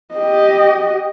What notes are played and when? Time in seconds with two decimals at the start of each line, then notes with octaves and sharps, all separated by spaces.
0.15 G4 D#5